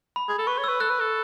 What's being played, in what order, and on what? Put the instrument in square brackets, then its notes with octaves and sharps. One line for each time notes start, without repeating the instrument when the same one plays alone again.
[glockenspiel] B5
[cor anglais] G#4
A4
[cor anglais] B4 [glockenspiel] C#6
[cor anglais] C#5
[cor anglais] B4 [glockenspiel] E6
[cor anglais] A4 [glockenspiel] F#6
[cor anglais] B4
A4